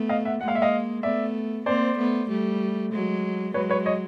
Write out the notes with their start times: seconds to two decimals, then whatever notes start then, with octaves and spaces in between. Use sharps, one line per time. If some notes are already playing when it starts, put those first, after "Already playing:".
Already playing: A3 B3
0.09 D#5 F5
0.25 E5 F#5
0.41 G#3 A#3 F#5
0.48 F5
0.55 E5
0.62 D#5 F5
1.03 A3 B3 D5 E5
1.66 A#3 C4 C5 D5
1.98 A3 B3
2.29 G3 A3
2.91 F#3 G#3
3.54 F#3 G#3 B4 C#5
3.70 B4 C#5
3.86 C#5 D#5